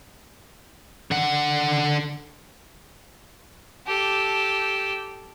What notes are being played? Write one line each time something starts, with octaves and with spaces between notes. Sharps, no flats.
D3 F#5
G4 A4